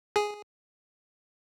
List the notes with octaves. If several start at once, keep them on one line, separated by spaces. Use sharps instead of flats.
G#4